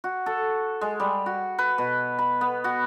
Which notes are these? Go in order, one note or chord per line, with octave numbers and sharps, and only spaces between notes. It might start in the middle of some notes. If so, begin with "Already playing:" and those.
F#4
A4
G#3
G3
F#4
B4
B2
B5
B3
F#4